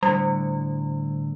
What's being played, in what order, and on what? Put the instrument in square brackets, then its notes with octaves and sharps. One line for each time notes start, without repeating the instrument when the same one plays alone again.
[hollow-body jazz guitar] A2 D3 A#5 [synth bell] G3